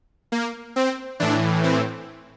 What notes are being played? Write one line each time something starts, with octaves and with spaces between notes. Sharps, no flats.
A#3
C4
A2 E3 D4
C4